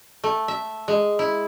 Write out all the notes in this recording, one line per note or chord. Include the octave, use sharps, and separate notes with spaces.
A3
E5
G#3
E4